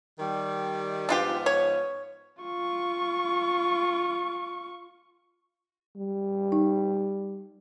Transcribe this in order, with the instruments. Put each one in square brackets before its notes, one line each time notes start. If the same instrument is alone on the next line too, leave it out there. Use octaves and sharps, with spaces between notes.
[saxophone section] D#3 G3
[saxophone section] G#2 F3 B3 [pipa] D4 F4 G4
[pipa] C#5
[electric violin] F4 C#6
[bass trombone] G3
[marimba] D#4